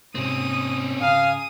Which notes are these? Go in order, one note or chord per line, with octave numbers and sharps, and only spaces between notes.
G#2 C3 C4 C#4 D#6
G#2 C#3 F5 G#5 A#5 D#6